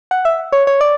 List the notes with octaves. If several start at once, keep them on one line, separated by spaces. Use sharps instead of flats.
F#5
E5
C#5
C#5
D5